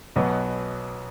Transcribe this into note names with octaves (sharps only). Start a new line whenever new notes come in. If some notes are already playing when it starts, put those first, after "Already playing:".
B1 B2 F#3 B3